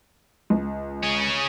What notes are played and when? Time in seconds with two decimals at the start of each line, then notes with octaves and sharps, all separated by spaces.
0.50 C#2
1.03 C#4 G#4